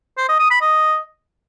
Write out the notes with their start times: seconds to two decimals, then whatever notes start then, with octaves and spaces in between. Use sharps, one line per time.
0.18 C5
0.29 D#5
0.40 D#6
0.51 B5
0.62 D#5